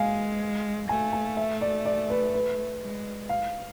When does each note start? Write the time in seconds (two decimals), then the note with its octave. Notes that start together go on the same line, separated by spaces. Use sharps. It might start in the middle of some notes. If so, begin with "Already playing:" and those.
Already playing: G#3 F5 G#5
0.89 A3 G#5
1.13 G#5
1.37 E5
1.61 D5
1.85 D5
2.10 B4
2.34 B4
2.81 G#3
3.29 F5